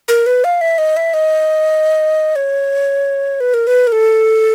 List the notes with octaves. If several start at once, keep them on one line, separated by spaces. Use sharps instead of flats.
A#4
B4
F5
E5
D#5
E5
D#5
C#5
B4
A#4
B4
A#4
A4